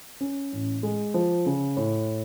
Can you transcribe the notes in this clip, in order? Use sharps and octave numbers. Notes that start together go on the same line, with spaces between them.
C#4
A1
G#3
F3
C#3
A2